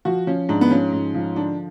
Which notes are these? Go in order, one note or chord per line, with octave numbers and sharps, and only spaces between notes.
F3 F#4
F3 C#4
G#2 D4
B3
F3 C#4
G#2
F3
D3 D4